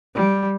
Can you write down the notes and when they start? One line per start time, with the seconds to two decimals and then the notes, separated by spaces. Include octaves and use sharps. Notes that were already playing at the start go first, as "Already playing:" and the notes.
0.15 G3